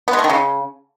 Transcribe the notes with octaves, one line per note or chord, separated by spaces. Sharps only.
B3
G#3
A3
D#3
C#3